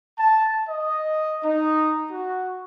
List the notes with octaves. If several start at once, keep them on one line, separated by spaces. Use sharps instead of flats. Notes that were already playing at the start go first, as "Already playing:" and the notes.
A5
D#5
D#4
F#4